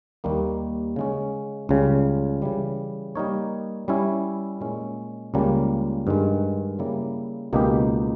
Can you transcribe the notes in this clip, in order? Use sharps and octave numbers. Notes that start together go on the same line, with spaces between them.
D#2 D#3 G3 A#3
C#3 G#3 C#4
C#2 C#3 G3
C#3 E3 G3
G3 A#3 D#4 A#4 C#5
G3 C#4 E4
A#2 G#3 C#4
C#2 C#3 G3 A#3
G2 D#3 G#3
C#3 G3 A#3 E4
C#2 B2 A#3 D#4 G4